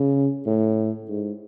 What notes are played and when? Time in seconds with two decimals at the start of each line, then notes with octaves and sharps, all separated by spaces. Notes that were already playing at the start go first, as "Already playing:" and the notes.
Already playing: C#3
0.47 A2
1.09 G#2